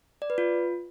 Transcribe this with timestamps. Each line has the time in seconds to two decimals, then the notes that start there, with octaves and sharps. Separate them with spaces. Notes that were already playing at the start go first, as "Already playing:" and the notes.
0.22 D5
0.30 B4
0.38 F4